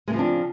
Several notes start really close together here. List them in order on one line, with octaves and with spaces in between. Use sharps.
G#3 C#3 F3 C4 D4